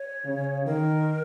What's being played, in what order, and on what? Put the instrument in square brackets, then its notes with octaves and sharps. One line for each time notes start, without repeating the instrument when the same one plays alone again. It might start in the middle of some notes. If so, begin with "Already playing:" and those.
Already playing: [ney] C#5
[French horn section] C#3
[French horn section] D#3 [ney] A#4